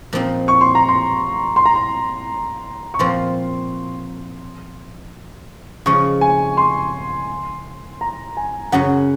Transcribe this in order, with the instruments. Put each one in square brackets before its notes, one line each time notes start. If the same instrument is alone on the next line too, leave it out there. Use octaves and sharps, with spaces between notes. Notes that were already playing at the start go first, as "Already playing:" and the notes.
[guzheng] A#2 F3 C4 D#4
[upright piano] C#6
C6
A#5
C6
C6
A#5
C6
C#6
[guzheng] A#2 F3 C4 [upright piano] C6
[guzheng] C#3 F3 G#3 [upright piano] C#6
[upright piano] G#5
C6
A#5
G#5
[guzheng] F#2 C#3 F#3 C#4 [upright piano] F#5